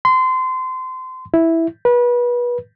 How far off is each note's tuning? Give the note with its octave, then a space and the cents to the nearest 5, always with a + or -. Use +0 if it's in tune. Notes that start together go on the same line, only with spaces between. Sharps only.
C6 -25
E4 -5
B4 -30